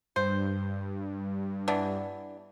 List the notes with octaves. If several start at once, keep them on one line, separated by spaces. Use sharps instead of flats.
G2 C5
E3 B3 D4